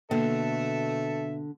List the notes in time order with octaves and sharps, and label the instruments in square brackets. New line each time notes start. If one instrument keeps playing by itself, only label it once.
[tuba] B2 [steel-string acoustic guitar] D3 [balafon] A#3 [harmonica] A4 E5